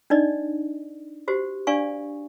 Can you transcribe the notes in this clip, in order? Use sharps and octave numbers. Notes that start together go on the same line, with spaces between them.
D4 D#4 D5 D#5
F#4 G4 C5
D4 D5 F5 G#5 C#6